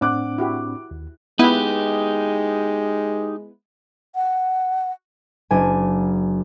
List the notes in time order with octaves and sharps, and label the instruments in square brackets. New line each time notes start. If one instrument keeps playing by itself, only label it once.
[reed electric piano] A2 C4 D4 [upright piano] F#5 D6 F#6
[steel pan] E4 F#4 G4
[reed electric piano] D#2
[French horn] G#3 [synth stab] B3 E4 B4 [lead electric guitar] D#4 G4
[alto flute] F#5
[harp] F#1 D4 G#5